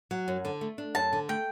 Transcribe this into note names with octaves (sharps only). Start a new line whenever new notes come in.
F#3
F#2
D3
A3
D4
F#2 A5
D3
A3 G5